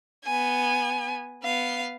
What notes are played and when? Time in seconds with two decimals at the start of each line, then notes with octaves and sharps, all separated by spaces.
0.24 B3 G#5
1.43 B3 F5